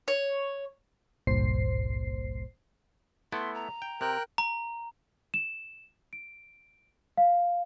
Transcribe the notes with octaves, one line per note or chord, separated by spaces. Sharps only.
C#5
G#1 C#2 G2 A#2 C5 C7
A3 B3 E4 C6
A#5
G5
C3 A#4 G5 F#6
A#5
E7
D7
F5